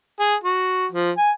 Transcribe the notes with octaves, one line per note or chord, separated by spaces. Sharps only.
G#4
F#4
F3
G#5